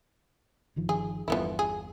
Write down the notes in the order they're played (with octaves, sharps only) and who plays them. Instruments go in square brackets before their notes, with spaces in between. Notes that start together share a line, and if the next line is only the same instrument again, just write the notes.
[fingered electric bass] G1 D#3 F3
[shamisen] G#4
[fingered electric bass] G1 E2 G2 [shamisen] F3 B3 E4
[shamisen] G#4